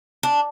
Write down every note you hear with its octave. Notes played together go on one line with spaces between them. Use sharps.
D4